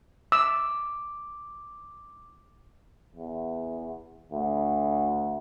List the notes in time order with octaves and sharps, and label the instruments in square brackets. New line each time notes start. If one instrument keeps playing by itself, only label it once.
[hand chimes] D6 [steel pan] E6
[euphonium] E2
D2